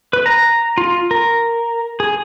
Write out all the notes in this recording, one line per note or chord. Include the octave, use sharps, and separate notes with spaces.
B4
A#5
F4
A#4
G#4